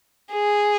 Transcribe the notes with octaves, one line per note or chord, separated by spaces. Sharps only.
G#4